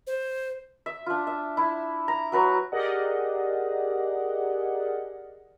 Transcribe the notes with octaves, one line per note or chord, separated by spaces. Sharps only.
C5
E5
D4 F4
E5
E4
A#5
F#3 B4 A#5 C#6
G4 G#4 A#4 D5 D#5 F#5